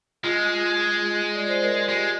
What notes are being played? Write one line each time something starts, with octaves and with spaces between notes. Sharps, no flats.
G#3 F4
D5
C5
A#4
G#4
G#3 G4